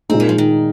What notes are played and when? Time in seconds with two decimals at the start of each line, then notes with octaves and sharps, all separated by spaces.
0.09 A#2 G#3 C4 D#4
0.20 A#3
0.29 F3
0.38 D#3